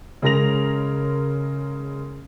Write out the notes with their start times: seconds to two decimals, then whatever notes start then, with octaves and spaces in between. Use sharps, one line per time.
0.22 C#3 G#3 A#4 A#6 F7